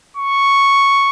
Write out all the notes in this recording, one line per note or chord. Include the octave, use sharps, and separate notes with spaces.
C#6